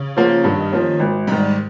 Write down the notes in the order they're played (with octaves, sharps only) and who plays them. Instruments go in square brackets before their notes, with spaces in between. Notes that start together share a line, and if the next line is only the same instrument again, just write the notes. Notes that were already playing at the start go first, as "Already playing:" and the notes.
Already playing: [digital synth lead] C#3
[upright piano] F3 A#3 C#4
[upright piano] G2 [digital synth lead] D#3
[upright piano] F3 A#3 C#4
G#1
[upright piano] G#2 D#3 [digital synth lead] G3